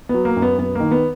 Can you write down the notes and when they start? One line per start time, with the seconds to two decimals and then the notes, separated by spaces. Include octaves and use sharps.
0.09 F#3 B3
0.25 A#3
0.37 F#2
0.42 B3
0.58 F#2 B3
0.75 D#3 A#3
0.91 B3